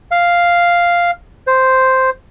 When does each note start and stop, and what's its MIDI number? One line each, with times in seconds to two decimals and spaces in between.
0.11 1.11 77
1.47 2.10 72